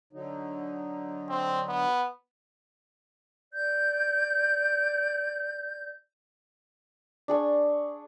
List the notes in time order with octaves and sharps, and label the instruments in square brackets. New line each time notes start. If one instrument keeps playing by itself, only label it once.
[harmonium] D3 F#3 D#4
[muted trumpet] C4
B3
[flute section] D5 G6
[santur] D4 G#4 C#6